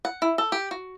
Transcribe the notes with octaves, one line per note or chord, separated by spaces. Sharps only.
F#5
E4
A4
G4
F#4